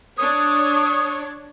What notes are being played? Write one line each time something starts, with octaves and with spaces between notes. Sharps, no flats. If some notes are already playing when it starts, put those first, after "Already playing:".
D4 C#5 D#6